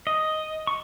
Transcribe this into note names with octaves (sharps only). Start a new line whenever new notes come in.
D#5
C#6